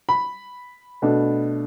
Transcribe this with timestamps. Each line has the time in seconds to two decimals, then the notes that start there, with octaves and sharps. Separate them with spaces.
0.09 B5
1.02 B2 A3 D4